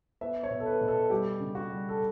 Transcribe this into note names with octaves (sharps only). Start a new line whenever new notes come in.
B3 E5
C#5
B2
A4
B4
B2
A4
G3 G4
C#3
F#4
G3
A4